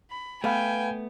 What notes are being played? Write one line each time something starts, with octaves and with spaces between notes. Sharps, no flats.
B5
A3 B3 B4 F5 G5 G#5 B5